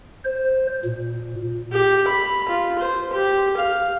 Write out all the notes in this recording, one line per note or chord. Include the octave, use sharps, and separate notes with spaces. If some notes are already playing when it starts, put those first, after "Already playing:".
C5
A#2
G4
B5
F4
C5
G4
F5